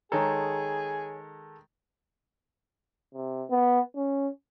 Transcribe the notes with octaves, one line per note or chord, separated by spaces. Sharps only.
D#3 G#3 G#4 A4 C#5 A5 A#5
C3
B3
C#4